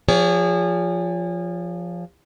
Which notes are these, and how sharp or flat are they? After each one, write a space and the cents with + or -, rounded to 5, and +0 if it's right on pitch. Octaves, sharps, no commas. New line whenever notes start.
F3 +0 G#4 -30 C#5 +45